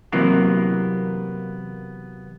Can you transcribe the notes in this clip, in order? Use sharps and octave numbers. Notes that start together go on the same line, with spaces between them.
C3 E3 F#3 A#3 B3